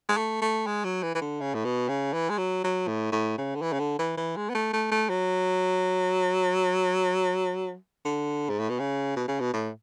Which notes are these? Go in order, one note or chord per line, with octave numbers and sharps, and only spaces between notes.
G#3
A3
A3
G#3
F#3
E3
E3
D3
C#3
A2
B2
C#3
E3
G#3
F#3
F#3
A2
A2
C#3
D3
E3
C#3
D3
E3
E3
G#3
B3
A3
A3
A3
F#3
D3
G#2
A2
B2
C#3
B2
C#3
B2
A2